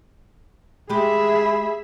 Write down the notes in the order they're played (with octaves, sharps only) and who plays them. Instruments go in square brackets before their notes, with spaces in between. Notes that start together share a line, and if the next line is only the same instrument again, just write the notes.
[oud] G#3 G4 [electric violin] G#4 E5 [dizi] B5